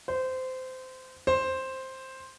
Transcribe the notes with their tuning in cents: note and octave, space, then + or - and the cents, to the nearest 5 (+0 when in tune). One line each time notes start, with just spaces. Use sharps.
C5 -20
C5 +5